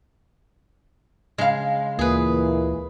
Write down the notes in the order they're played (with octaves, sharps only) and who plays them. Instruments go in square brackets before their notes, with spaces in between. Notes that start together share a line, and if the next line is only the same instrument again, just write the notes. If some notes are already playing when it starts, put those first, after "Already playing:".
[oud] C#3 F5 [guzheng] G#3
[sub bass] D2 [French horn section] A#2 E3 A#3 [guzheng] G#4 B4